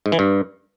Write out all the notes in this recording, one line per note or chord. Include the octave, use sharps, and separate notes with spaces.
G#2
E3
G2